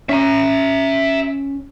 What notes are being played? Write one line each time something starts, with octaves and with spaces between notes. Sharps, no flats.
C#4 E5 A#5